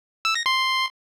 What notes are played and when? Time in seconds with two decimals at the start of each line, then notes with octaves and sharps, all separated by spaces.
0.25 E6
0.35 A#6
0.46 C6